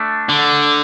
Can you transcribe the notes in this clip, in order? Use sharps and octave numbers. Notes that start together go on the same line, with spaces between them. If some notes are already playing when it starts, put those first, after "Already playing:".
Already playing: A3 D4
D3